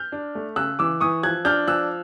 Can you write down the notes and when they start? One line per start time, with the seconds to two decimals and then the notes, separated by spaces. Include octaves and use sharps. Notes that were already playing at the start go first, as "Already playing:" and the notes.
Already playing: F6 G6
0.12 D4
0.35 A3
0.56 C#3 E6 F#6
0.79 E3 D6 E6
1.01 E3 C#6 D#6
1.23 F3 F#6 G#6
1.45 D4 F6 G6
1.68 F3 E6 F#6